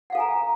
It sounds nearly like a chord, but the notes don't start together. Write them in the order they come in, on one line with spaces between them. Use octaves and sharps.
F#5 F5 A4 G#5 A#5